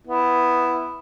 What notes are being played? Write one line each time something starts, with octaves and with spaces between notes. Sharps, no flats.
B3 E4